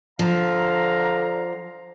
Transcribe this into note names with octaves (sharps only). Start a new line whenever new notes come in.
D3 F3 F5 A#5